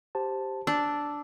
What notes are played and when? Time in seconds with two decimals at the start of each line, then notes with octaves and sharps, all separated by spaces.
0.15 G4 C5 A5
0.67 D4 E6